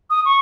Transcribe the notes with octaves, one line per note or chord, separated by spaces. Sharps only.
D#6
C#6